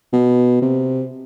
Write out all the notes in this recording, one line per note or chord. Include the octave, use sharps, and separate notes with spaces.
B2
C3